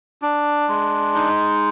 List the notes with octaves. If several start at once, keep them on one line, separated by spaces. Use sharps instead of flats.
D4
G#3
D#4